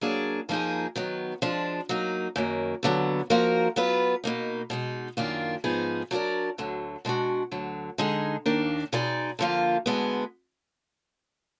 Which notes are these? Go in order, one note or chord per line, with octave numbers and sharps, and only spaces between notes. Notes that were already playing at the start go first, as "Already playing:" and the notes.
F#3 A#3 D4 G#4 D5
F2 F3 A#3 D#4 G#4
D#3 F#3 B3
F3 G#3 D4
F#3 A#3 D#4
F#2 D#3 F#3 A#3
D#2 D3 F#3 B3
F3 A#3 D#4 F#4 A#4
F#3 B3 F4 B4
B2 A#3 D#4
B2 G#3 D#4
F#2 D#3 A#3 D4 F4
G#2 F3 B3 D#4 G#4
F#3 D4 F4 A#4 D5
D2 D3 F#3
B2 G#3 D4 F#4
D2 D3 F#3
D3 G#3 D#4 G#4
D#2 D#3 A#3 D4
B2 G#3 D#4 G#4 D5
D3 F3 A#3 F4
D2 D3 G#3 B3